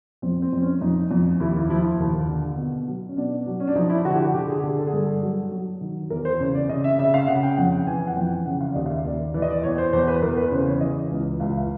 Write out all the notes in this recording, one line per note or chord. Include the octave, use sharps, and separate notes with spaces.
F2 C4
C4
F2 C4
C#4
F2 D#4
F2
D#2 E4
E4
F3 E4
D#2
D3
B2
F#3
C#4
B2 D4
F#3
C#4
D4
F3 D#4
E4
D3 F#4
G4
F#4
D3 G4
G#4
D3 G#4
A4
G#4
G2 A4
F#3
F#3
D#3
E2 A#4
C5
C#3 C#5
D5
C#3 D#5
E5
C#3 E5
F5
C#3 F#5
G5
F2 F#5
G5
E3 G#5
F#5
F2 G5
C#3 F#5
F5
D5
D#2 D#5
F5
E5
D#2 D5
E3 D5
D#5
D5
E2 C#5
C5
E2 C5
B4
E2 A#4
B4
C#3 C5
C#5
E3 D#5
C#2
C#2 F5
F5